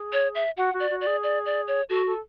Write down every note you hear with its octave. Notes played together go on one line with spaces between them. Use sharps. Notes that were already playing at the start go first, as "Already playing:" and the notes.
Already playing: G#4
C#5
E5
F#4 F#5
F#4
D5
F#4
D5
G#4
D5
D5
C#5
F#4 A4
A4